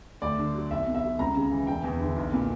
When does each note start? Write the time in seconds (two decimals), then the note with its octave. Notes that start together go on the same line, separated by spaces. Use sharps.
0.22 D2 D5
0.38 D3
0.54 F#3
0.70 B1 E5
0.87 B2
0.95 E5
1.03 F#3
1.19 C#2 A#5
1.36 C#3
1.51 E3
1.67 E1 G5
1.84 E2
2.00 D3
2.17 B1
2.33 A#2